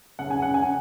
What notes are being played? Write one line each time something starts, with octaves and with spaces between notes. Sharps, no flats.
C#3 F#5
G#5
C#3
F#5
C#3 G#5